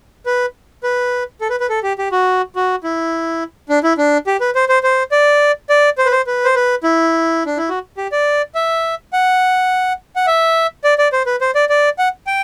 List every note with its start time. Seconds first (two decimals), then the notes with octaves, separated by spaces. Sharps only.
0.26 B4
0.83 B4
1.41 A4
1.50 B4
1.60 B4
1.69 A4
1.83 G4
1.98 G4
2.12 F#4
2.56 F#4
2.84 E4
3.69 D4
3.83 E4
3.98 D4
4.27 G4
4.40 B4
4.55 C5
4.69 C5
4.83 C5
5.12 D5
5.70 D5
5.98 C5
6.06 B4
6.12 C5
6.27 B4
6.45 C5
6.55 B4
6.83 E4
7.46 D4
7.57 E4
7.69 F#4
7.97 G4
8.12 D5
8.55 E5
9.13 F#5
10.16 F#5
10.27 E5
10.84 D5
10.98 D5
11.12 C5
11.26 B4
11.41 C5
11.55 D5
11.69 D5
11.98 F#5
12.27 G5